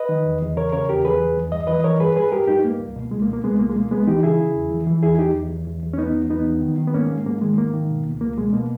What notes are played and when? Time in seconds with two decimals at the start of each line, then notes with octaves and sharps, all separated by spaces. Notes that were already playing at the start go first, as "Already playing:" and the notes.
Already playing: B4 D#5
0.09 D#3
0.25 E2
0.42 E2
0.57 C#3 A#4 C#5
0.72 C#3 A#4 C#5
0.89 E2 G4 A#4
1.05 E2 G#4 B4
1.20 E2
1.37 E2
1.52 G2 D#5
1.67 E3 B4 D#5
1.84 E3 A#4 C#5
2.00 G2 G#4 B4
2.16 G2 G#4 B4
2.32 G2 G4 A#4
2.48 G2 D#4 G4
2.64 G2 A#3
2.80 C#2
2.96 B2
3.11 C#2 G#3
3.22 A#3
3.28 B2
3.33 A#3
3.44 C#2 G#3 B3
3.59 C#2 A#3
3.69 G#3
3.76 B2 A#3
3.91 C#2 G#3 B3
4.07 E3 D#4 G4
4.23 C#3 E4 G#4
4.39 C#3
4.55 E2
4.71 E3
4.87 E3
5.03 E2 E4 G#4
5.18 E2 D#4 G4
5.35 E2
5.50 E2
5.67 E2
5.83 E2
5.93 C#4
5.98 E2 B3 D#4
6.14 E2
6.30 E2 B3 D#4
6.46 E2
6.62 D#3
6.78 D#3
6.88 B3
6.94 G#2 A#3 C#4
7.10 G#2
7.26 G#2 A#3
7.41 D#3 G#3
7.58 G#2 A#3
7.73 D#3
7.90 B2
8.06 C#2
8.21 C#2 A#3
8.37 B2 G#3
8.53 B2 A#3